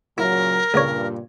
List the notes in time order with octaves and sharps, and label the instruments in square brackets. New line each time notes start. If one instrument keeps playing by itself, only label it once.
[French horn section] A#2 C#3 F#3 [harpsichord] E4 [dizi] A#4
[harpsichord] C#2 C#5 [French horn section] G2 A#2